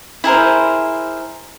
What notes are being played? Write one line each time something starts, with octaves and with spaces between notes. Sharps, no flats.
E4 G#4 A#4 C5